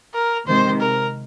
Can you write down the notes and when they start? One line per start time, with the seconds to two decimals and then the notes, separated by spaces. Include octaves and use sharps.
0.14 A#4
0.47 C3 D#3 G#3 C5
0.81 A#4